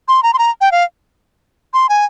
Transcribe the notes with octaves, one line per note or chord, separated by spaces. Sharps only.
C6
A#5
C6
A#5
G5
F5
C6
G#5